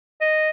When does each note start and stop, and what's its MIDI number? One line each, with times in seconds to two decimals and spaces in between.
0.21 0.50 75